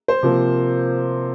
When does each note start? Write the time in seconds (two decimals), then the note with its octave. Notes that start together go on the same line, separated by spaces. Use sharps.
0.08 C5
0.23 C3 F3 A#3